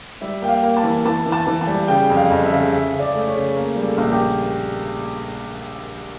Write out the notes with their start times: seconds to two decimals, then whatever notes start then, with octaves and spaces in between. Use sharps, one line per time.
0.21 G3 E5
0.42 A#3 G5
0.49 F5
0.63 A#3
0.77 A5
0.83 E3
1.05 E3 A5
1.26 E3
1.32 A5
1.47 E3
1.61 A5
1.67 G3
1.88 C#3 G5
2.10 F2
2.17 F5
2.30 F2
2.45 E5
2.52 C#3
2.72 C#3 E5
2.93 C#3
3.00 D5
3.14 A3
3.27 C#5
3.34 C#3
3.56 A#3 A#4
3.76 G3
3.84 A4
3.98 A#1
4.12 G4